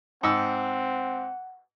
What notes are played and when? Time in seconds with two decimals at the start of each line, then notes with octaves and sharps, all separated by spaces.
0.23 G#2 C4 F#5 E6